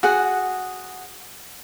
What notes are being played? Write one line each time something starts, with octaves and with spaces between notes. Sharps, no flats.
F#4 G#4 F#5